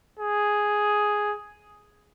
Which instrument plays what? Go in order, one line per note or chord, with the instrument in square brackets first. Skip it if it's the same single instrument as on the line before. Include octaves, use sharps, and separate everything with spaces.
[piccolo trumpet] G#4